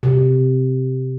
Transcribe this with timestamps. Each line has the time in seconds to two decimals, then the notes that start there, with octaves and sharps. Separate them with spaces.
0.03 C3